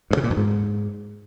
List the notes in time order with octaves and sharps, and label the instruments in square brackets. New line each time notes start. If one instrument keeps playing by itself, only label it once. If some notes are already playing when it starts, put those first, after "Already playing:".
[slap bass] G2
C#3
A#2
F2
G#2